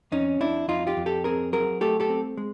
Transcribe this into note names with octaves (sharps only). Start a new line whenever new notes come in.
F2 C#4 D#4
F2 D4 E4
F2 D#4 F4
F4 G4
F2
G4 A4
C4 G#4 A#4
F#3 G#4 A#4
A3 G4 A4
G4 A4
C4
G#3